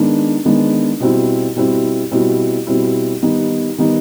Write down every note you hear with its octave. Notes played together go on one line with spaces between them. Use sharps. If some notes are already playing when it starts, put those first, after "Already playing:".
Already playing: D#3 G#3 B3 D4
D#3 G#3 B3 D4
B2 G3 C4 E4
B2 G3 C4 E4
B2 G3 C4 E4
B2 G3 C4 E4
D#3 G3 B3 D#4
D#3 G3 B3 D#4